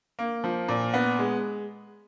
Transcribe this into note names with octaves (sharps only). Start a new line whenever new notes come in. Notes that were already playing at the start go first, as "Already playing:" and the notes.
A#3
F3
A#2
B3
G#3